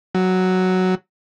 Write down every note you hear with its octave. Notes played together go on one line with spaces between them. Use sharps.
F#3